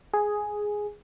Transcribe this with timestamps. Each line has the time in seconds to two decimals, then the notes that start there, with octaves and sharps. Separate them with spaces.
0.14 G#4